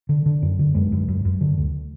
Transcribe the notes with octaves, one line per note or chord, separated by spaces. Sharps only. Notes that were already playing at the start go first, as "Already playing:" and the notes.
D3
D3
F#2
D3
F#2 G#3
F#2
F#2
F#2
D3
D2